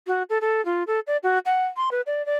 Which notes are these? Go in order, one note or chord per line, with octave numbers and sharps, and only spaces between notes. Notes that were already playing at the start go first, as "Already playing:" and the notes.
F#4
A4
A4
F4
A4
D5
F#4
F#5
C6
B4
D5
D5